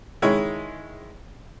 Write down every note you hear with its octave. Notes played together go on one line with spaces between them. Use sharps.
D#3 G#3 E4 C#5